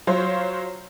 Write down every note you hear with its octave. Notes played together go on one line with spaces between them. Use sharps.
F#3 F4 C5 C#5